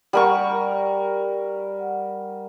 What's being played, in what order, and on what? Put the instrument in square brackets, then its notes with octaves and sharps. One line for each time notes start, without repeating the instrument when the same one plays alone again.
[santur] G3 A#4 C#6 [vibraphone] F#5